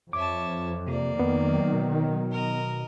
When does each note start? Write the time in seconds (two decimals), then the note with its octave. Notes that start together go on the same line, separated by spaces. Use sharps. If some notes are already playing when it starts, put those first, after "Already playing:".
0.13 F2 C#5 E5 A5 D6
0.87 C3 A#3 D5
1.19 F2 D#3 F#3 B3
1.73 B2
2.32 A#4 D#5